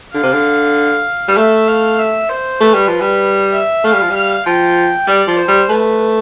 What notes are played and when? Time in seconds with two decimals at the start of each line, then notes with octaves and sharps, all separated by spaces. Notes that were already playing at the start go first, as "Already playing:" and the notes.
0.14 D3 F5
0.23 C3
0.33 D3
1.28 G3
1.37 A3 E5
1.68 F5
1.99 E5
2.29 C5
2.61 A3 B4
2.74 G3
2.88 F3
3.01 G3
3.53 E5
3.84 A3 F5
3.93 G3
4.02 F3
4.10 G3 F5
4.46 F3 G5
5.07 G3 D5
5.27 F3
5.38 C5
5.48 G3
5.69 A3 B4